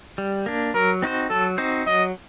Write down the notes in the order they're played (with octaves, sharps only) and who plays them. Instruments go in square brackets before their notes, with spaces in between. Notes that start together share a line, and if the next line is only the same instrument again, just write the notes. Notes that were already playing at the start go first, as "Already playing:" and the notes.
[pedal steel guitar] G3
A#3 D4
[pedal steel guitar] F#3 [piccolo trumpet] A#4
[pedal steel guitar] C4 D#4 F#4 C5
[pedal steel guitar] F#3 [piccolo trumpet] A4
[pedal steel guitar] C4 D#4 F#4 C5
[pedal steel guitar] F#3 [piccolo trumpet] D#5